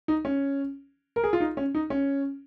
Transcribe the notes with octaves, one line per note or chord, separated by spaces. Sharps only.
D#4
C#4
A#4
G#4
F4
D#4
C#4
D#4
C#4